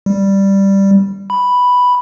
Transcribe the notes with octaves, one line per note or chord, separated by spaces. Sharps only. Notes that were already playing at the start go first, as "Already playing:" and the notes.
G3
B5